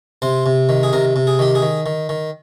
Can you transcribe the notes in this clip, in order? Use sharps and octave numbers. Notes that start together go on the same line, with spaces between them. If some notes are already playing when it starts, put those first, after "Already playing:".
C3 C5
C3
D#3
G#4
C3 A#4
C3
G#4
D#3 G4
G#4
D#3
D#3
D#3